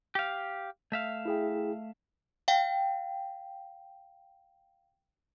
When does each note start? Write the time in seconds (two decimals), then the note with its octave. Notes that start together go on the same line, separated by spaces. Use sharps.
0.15 G4 F5
0.92 A3 E5 F5
1.25 E4 G#4 G5
2.48 F5 G5